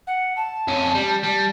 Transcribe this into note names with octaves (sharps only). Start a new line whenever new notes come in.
F#5
A5
F2 C#4
G3
G3